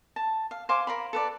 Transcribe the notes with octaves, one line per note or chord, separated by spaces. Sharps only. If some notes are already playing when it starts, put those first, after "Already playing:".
A5
F5
C5 F5 G#5 D6
A#4 F5 B5
A4 B4 D5